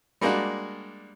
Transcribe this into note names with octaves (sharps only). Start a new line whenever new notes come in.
G3 G#3 A#3 D4 F#4